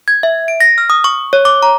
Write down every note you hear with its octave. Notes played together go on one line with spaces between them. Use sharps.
G#6
E5
D7
A#6
F6
D#6
C#6
C#5
D6
A#5